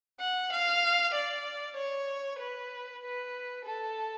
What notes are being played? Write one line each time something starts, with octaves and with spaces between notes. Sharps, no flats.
F#5
F5
D5
C#5
B4
B4
A4